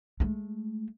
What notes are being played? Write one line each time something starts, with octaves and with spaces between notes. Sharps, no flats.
G#3 A3